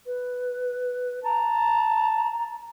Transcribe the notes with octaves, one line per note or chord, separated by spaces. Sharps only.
B4
A5 A#5